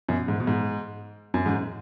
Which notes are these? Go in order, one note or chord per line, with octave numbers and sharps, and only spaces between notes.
F#2 B2
G#2
B2
G#2
F#2
G#2